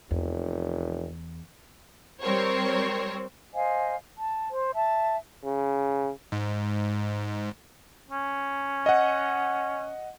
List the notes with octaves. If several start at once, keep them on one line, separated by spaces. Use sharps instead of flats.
F1 E2
G3 C4 A#4 C5 C#5
C5 D#5 F5 G#5
A5
C5
E5 A5
C#3
G#2
C#4
D#5 F#5